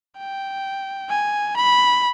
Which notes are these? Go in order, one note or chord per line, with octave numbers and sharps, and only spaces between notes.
G5
G#5
B5